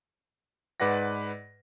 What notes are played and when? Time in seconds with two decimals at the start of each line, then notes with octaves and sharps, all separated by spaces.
0.80 G#2 B4 D5 F#5 A#6